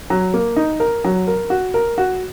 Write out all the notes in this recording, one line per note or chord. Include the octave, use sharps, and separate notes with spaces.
F#3
A#3
D#4
A#4
F#3
A#4
F#4
A#4
F#4